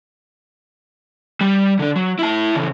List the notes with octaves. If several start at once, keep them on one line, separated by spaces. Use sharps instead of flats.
G3
D3 D4
F#3
E4 A5
C#3 E3